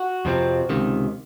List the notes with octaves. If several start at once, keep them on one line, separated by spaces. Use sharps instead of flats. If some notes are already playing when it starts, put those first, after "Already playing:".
Already playing: F#4
F2 C3 F3 C4
C#2 C3 D#3